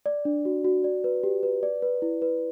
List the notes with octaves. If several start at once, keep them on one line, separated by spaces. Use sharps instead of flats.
D5
D4
F#4
F#4
D5
B4
G4
B4
D5
B4
E4
B4